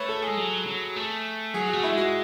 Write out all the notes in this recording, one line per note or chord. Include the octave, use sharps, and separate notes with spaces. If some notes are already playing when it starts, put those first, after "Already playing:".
Already playing: A3 B4 C#5
A4
G#4
G#3
F#3
F#3
A3
F#3 G#4
A3 F#4
E4
G#3 F#4